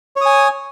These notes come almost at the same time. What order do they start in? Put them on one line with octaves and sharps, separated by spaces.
C#5 D#6 G#5